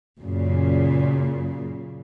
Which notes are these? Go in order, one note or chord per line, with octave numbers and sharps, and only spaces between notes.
F#2 A#2 C#3